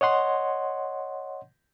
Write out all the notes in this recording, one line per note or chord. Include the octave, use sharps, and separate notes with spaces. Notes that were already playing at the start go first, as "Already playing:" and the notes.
C#5 D#5 F#5 C6